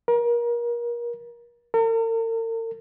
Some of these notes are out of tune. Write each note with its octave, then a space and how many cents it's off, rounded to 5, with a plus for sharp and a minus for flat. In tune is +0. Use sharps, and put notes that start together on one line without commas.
A#4 +30
A#4 -45